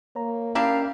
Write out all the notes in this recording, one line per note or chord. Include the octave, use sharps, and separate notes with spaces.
A#3 C#5 A#5
C#4 D4 E4 G4 A#4 F5 A#5